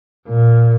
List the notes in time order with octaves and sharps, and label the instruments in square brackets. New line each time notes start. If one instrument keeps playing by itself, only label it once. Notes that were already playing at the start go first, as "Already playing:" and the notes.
[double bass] A#2